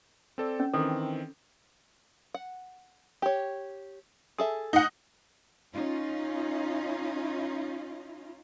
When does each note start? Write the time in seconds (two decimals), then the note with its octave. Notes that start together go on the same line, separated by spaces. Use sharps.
0.38 C4 A4 D5
0.60 C#4
0.74 D#3 E3 C4 A4
2.34 F#5
3.22 G4 C#5
4.38 G#4 A4 E5
4.73 D#4 F#5
5.73 C#4 D#4 F4